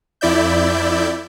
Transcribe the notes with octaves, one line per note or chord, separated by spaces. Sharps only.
F2 E4 D5 E5 G6